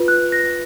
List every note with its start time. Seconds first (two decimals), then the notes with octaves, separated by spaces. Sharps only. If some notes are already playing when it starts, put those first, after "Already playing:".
Already playing: F4 B4
0.08 F#6
0.32 A#6